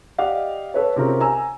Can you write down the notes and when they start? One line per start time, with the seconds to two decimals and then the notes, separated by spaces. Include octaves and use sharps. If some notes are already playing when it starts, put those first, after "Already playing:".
0.18 G4 D5 D#5 F5 F#5
0.74 A4 B4 C#5
0.96 C3 C4 C#4 F4 G#4 A#4
1.21 G#5 A#5 E6